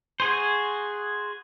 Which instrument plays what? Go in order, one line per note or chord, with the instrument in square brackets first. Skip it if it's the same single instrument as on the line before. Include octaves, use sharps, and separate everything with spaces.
[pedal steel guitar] F#4 G#4 C5